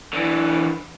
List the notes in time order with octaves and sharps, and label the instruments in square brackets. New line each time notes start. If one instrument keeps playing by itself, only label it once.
[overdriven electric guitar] D3 E3